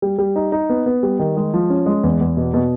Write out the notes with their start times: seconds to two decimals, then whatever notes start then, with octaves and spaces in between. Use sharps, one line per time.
0.02 G3
0.18 G3
0.36 D#4
0.52 D#4
0.70 B3
0.86 B3
1.03 G3
1.19 D#3
1.37 G#3
1.54 F3
1.70 C#4
1.86 G#3
2.03 E2
2.20 E2
2.37 B2
2.54 B2